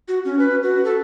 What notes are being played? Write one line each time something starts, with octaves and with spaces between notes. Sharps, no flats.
F#4
C#4
B4
F#4
A4